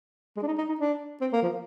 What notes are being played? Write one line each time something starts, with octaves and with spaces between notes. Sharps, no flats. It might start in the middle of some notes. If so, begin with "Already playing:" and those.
G#3
D4
D#4
D#4
D#4
D4
C4
A#3
F3